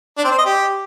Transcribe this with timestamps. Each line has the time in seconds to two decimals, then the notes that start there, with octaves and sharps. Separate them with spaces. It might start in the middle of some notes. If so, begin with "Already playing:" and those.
0.17 D4
0.24 C4
0.31 C5
0.38 D#5
0.45 G4